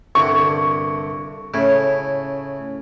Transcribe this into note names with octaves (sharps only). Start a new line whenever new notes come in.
C2 G2 D3 C#6
A2 C#3 E4